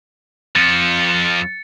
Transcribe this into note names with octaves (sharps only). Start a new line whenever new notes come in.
F2 F3 A6 C#7